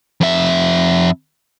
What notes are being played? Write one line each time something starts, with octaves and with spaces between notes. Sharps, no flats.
F2 E5